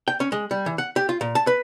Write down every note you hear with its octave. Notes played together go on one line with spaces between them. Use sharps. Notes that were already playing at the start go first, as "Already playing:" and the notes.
G5
C#4
G#3
G3
E3
F#5
G4
F4
A#2
A5
B4